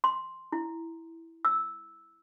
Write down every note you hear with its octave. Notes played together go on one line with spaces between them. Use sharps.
C6
E4
E6